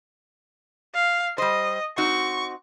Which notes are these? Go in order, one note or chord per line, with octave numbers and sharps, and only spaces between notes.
F5
G3 C5 D#5
C4 D#4 F#4 C#6